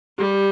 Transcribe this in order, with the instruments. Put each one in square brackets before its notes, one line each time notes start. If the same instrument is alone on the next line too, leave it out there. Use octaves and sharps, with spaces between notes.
[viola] G3 [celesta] G4